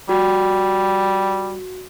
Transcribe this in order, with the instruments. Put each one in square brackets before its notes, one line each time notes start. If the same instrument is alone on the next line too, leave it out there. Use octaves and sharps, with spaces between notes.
[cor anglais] G3 [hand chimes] F#4